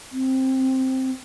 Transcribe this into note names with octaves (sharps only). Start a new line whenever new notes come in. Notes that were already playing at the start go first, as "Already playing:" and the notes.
C4